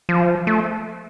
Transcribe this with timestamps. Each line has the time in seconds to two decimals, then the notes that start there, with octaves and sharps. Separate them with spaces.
0.09 F3
0.47 A3